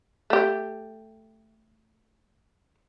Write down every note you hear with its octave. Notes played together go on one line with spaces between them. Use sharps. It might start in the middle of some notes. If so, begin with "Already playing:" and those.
A3 G4